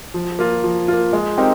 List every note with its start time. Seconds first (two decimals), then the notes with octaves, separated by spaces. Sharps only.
0.14 F3
0.39 A#3 F4
0.64 F3
0.88 A#3 F4
1.13 G#3
1.38 C4 D#4 G4 A#4